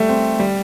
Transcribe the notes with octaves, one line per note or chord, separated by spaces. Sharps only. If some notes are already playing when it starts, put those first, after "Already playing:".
Already playing: G3 A3
C4
G3